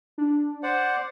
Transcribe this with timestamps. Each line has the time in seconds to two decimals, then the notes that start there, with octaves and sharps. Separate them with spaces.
0.18 D4
0.63 C5 D5 F#5 D6